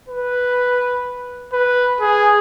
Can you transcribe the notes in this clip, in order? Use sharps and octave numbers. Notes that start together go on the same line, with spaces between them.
B4
B4
G#4